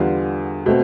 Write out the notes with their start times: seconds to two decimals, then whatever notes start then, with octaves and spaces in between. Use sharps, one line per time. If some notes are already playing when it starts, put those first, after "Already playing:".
Already playing: E2 D3 G3 B3 F4
0.66 B2 A3 C4